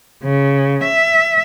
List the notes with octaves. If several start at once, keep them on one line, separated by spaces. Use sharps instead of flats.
C#3
E5